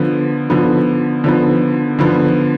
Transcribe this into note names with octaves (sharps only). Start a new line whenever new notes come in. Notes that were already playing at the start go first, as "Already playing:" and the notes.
Already playing: D3 F3 B3
D3 F3 B3
D3 F3 B3
D3 F3 B3